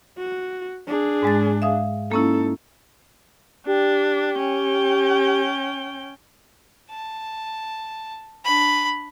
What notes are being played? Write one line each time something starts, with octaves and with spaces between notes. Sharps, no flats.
F#4
D4 G#4
G#2 G#3 A6
E5 F5 D#6
A#3 C#4 D#4 E4 A4
D4 G4
C#4 G5
A5
D4 B5